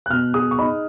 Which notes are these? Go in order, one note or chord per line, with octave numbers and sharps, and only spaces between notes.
F#6
B2 F6
G#4 D#6
C#6
D#4 B5